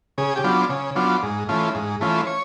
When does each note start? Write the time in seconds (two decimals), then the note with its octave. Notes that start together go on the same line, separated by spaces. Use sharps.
0.18 C#3 G#4
0.36 G4
0.44 F#3 B3 D4 F4
0.69 C#3
0.96 F#3 B3 D4 F4
1.23 G#2
1.49 E3 A3 C#4 F4
1.75 G#2
2.01 E3 A3 C#4 F4
2.27 C#5